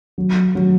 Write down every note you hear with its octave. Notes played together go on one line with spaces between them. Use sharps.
F#3
F#3